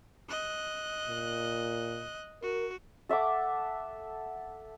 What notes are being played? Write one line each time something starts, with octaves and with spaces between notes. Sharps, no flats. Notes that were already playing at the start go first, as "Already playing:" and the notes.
D#5 F#6
A#2
F#4 A#4
A4 E5 F#5 D6